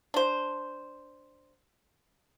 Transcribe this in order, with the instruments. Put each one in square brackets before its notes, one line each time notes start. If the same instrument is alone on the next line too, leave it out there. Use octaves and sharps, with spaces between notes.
[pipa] D4 C5